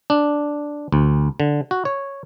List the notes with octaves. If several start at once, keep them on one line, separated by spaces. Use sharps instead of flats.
D4
D2
D3
F#4
C#5